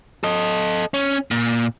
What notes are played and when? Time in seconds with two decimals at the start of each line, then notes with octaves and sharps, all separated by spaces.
0.24 A4 D#5
0.94 C#4
1.31 A#2